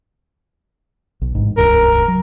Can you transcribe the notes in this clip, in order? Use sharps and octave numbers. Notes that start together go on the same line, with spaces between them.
B1
A1 G#2
D#1 C#2 G2 A#4
F#3